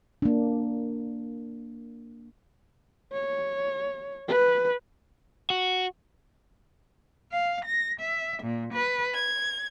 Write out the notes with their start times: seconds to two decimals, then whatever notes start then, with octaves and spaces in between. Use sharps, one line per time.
0.22 A#3 D4
3.12 C#5
4.28 B4
5.50 F#4
7.32 F5
7.65 A#6
8.00 E5
8.42 A#2
8.73 B4
9.16 G#6